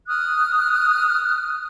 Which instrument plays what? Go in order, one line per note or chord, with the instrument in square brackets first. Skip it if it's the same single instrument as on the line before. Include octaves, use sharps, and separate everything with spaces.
[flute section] D#6 F6 F#6